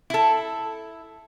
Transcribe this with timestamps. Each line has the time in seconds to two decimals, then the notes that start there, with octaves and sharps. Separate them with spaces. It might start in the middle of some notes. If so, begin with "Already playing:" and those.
0.10 E4 A4